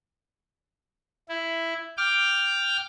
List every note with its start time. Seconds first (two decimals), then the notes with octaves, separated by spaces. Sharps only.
1.28 E4
1.98 G5 D6 F6